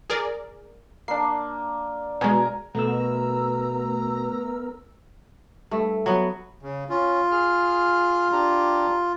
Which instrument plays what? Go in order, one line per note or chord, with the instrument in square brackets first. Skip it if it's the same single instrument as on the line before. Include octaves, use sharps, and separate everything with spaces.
[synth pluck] G#4 A#4 D5
[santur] A#3 D4 [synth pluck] C7
[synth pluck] B2 G#3 [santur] A#4 G#5 A#5
[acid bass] B2 [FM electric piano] A3 E6 [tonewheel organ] B3 A#4 [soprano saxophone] A#5
[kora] G2 A3
F#3 B3
[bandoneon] C#3
[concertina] C#4 [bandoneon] F4
[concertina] G#4 F6
D4 G4 A#5